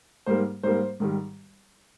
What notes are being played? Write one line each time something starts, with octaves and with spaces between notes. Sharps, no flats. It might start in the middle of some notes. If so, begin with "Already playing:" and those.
G#2 G3 A#3 C5
G#2 G3 A#3 C5
G#2 D#3 G3